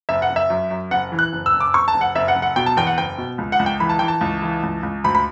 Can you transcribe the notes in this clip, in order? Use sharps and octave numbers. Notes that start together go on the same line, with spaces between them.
F#1 E5
F#5
F#1
E5
F#2
F#2
F#1 F#5
E3
F#6
F#1
E6
F#1
D6
F#1 C#6
A5
F#1
F#5
F#1 E5
F#5
F#1
F#5
B2 G5
A5
E2 G5
F#5
F#1 G5
B2
C#2
F#5
C#2
G5
E3 B5
A5
E3 G5
A5
C#2
E3
C#2
C#2
D2 B5
B5